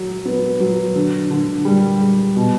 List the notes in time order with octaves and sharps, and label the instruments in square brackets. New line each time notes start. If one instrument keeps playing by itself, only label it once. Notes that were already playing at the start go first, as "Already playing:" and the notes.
Already playing: [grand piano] F#3
B3
F#3
D3
D3
G3
G3
B2